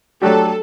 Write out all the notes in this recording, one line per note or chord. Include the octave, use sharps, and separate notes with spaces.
F#3 A3 D4 G4 A4